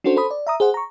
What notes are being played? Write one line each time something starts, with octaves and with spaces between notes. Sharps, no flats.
C#4 D4 F#4 A4 C5
A4 C5 B5 D#6
D5
E5 A#5 D#6
G#4 C5 F#5
A#5 C#6